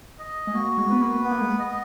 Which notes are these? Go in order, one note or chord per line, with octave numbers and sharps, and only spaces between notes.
D#5
G#3
A#3 F#4
G#3
B3 B4
A#3
B3
A#3
G#3
D#5